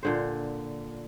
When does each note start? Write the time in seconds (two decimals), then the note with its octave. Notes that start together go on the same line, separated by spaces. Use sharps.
0.03 A#2 D3 C5